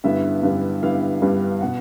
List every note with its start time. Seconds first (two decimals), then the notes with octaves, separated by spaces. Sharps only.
0.04 G2 D3 G3 B3 E4 E5
0.43 G2 D3 G3 B3 E4
0.83 G2 D3 G3 B3 E4 F5
1.21 G2 D3 G3 B3 E4
1.61 B2 F#5